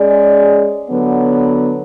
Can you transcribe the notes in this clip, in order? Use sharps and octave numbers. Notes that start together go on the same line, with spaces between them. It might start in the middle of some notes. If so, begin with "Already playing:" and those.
Already playing: G#3 C#4 G#4 D5
D3 F#3 B3